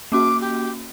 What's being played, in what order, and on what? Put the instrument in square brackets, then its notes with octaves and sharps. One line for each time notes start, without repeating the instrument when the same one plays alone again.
[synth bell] A#3 C#4 F#4 [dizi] D6
[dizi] G4